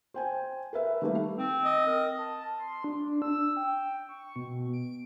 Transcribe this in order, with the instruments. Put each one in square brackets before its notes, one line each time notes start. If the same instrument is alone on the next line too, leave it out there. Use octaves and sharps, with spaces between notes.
[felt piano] C5 G5 G#5
A#4 B4 E5
D#3 G3 A3 A#3 B4
[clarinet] C4
[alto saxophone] D#5
[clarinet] A#4
[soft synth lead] A5
C6
D4
E6
G5
C#6
B2
D7